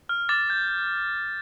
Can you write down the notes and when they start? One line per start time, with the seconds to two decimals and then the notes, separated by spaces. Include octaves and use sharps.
0.09 F6
0.29 D6 A6
0.50 G6